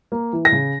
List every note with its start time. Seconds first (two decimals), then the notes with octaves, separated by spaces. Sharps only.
0.12 A#3
0.33 E3
0.45 A#6
0.52 C#3